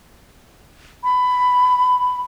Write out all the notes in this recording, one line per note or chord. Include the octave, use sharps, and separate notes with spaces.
B5